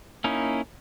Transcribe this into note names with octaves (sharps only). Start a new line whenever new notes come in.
A#3 C#4 D#4 E4